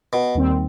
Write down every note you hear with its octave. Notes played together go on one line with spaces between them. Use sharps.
B2
D#2 D#3 G3 C4